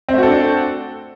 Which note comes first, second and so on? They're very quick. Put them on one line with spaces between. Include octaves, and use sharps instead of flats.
C4 A3 F#4 A4 D4